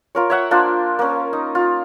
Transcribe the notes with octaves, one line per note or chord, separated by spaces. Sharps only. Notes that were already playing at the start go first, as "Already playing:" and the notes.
F4 A#4 C#5
C#5 E5 F#5
A#3 D4 F4 C5
A#3 C#4
D#4
F4